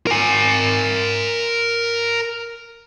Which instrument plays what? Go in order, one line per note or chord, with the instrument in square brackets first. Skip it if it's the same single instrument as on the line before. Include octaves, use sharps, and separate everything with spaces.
[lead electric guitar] A#4 G#5